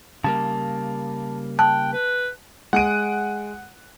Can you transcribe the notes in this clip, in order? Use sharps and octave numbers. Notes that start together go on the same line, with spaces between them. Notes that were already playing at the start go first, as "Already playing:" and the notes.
C#3 G3 A#3 A5
G5 A5 F#6
B4
G#3 F#5 F#6 D7 D#7